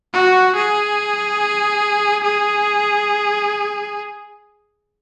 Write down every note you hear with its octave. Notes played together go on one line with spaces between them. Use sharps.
F#4
G#4
G#4